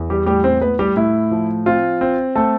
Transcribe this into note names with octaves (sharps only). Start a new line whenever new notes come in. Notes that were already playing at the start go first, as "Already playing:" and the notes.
Already playing: E2
G3 G4
A2 G3 G4
C4 C5
A2 B3 B4
G3 G4
A2 E4
F3
C4 F4
C4
A3 C4 A4